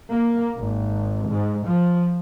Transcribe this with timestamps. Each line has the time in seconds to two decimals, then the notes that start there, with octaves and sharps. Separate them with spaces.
0.12 A#3
0.58 G#1
1.28 G#2
1.65 F3